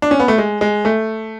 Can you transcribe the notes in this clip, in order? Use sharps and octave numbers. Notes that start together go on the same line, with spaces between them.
D4
C#4
B3
A3
G#3
G#3
A3